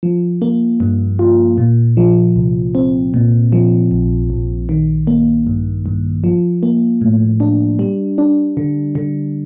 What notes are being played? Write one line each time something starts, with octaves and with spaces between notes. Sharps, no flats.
F3
A#3
G2
F4
A#2
F3
C2
C4
A#2
F3
A#1
A#1
D#3
A#3
G2
G2
F3
A#3
A2
D4
G3
D4
D3
D3